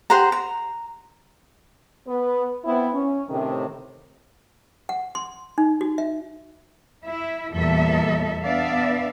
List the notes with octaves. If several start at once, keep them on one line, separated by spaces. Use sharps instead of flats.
G4 C5 F#5 A#5
A#5
B3 B4
B3 C4 E4
C#4
A2 C3 D#3
F#5
C6
D#4
F#4
E5
E4 E5
E2 A#2 E3 G3 A4 E5
B3 D4 D5 E5 F5